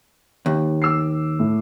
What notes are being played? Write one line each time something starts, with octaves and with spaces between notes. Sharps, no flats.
D#2
D6 E6 C7
A2